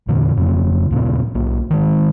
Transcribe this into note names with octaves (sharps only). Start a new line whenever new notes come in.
E2 G2 A#2 D3
F2 C#3
D#2 A#2 C#3 B3
B1 A#3
D#3 G#3